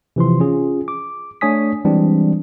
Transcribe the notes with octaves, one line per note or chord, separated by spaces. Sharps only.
C3 E3 F3 C6
C#4 F4 G#4
D6
A3 D4 C#5 G#5 D#6 B6
E3 G3 G#3 C4 D4